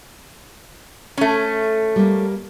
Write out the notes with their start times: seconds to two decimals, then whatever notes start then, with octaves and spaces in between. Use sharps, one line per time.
1.17 A3 C#4
1.96 G3 A#3